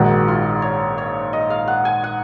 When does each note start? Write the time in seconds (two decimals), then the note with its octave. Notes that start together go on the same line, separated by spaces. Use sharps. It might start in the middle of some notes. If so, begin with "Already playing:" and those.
Already playing: A#1 G#2 D#3 F#4
0.28 F4
0.62 C#5
0.98 C#5
1.33 D#5
1.50 F5
1.68 F#5
1.85 G#5
2.04 F#5